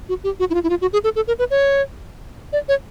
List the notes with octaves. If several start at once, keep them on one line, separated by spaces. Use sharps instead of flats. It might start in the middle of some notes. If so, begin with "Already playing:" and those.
F#4
G4
F#4
E4
F4
E4
F4
F#4
G#4
A4
A4
A#4
B4
C#5
D5
C#5